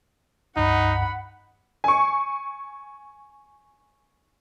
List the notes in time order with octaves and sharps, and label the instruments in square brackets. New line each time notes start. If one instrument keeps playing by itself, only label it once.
[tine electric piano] C#2 G2 [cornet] D#4 [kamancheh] F#5 B5
[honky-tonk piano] G#5 C#6